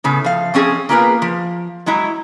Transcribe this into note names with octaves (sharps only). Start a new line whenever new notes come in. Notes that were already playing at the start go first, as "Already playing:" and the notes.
A2 C#3 B3
F3 F5
F3 C4 C#4 G#4
A#3 B3 F4 G#4 A#4 B4
F3
F#3 G#3 E4 A#5